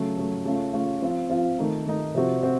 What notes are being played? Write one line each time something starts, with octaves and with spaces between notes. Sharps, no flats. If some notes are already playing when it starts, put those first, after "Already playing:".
Already playing: C#3 F#3 A3
C#3 F#3 A3
C#3 A3 C#4 F4
C#3 A3 C#4 F4
F3 C4 F4
F3 C4 F4
D#3 A3 D#4
D#3 A3 D#4
C3 F3 C4 F#4
C4 F#4